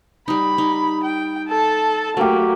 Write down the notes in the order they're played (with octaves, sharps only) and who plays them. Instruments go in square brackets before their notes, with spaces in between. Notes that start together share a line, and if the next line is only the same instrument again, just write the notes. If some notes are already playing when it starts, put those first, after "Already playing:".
[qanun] G3 D#4 [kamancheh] B5
[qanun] D#4
[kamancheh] G5
A4 A5
[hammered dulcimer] F#3 G4 [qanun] A3 [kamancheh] A#3